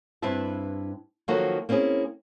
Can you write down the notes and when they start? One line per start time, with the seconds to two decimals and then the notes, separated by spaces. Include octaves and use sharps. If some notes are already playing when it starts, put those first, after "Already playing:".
0.22 G2 C4 E4 B4 E5 A5
1.28 D#3 F3 F#3 A#3 F#4 A4
1.69 A#3 C4 C#4 E4 G#4